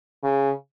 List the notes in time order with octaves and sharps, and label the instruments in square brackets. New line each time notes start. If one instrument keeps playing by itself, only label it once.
[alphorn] C#3